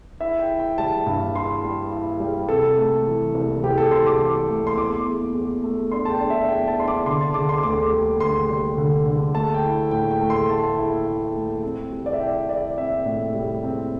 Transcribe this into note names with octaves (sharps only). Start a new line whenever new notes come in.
E4 E5
G5
E4
G5
G3 A5
G2
E4 C6
G3
E4
G3
C3 A4
A3
E3
C2
C2 G4
A4
C2 C6
D6
E3
A3
C6
E2 D6
E2
E2
A3
D4 C6
A5
G5
D4
E5
E2 G5
A5
D4 C6
D6
D3 C6
A5
D3 D6
C6
D2 D6
G3
D2 C6
G3
D3
D3
A3 A5
G5
E4
A2 G5
G5
A3
C6
A3 A5
E4
E4
A3
C4
G3
D5
E5
E4 G5
E4 D5
C4 E5
A2
G3
C4